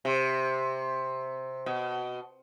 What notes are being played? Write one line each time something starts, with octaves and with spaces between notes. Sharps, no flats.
C3
B2